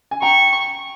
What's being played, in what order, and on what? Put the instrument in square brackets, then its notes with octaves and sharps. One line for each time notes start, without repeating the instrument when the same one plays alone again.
[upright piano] G#5
[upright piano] G5 A#5 [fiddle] C#6